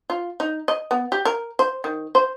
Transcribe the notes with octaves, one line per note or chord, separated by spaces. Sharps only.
F4
D#4
D#5
B3
G4
A#4
C5
D#3
C5